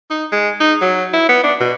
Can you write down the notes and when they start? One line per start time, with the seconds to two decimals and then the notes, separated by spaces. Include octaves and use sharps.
0.10 D#4
0.32 G#3
0.60 D#4
0.81 F#3
1.13 E4
1.29 B3
1.44 D4
1.60 B2